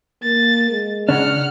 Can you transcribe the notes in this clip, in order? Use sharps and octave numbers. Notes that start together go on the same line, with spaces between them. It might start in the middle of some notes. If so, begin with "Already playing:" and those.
A#3 A6
G#3
C#3 D4 F#5 F6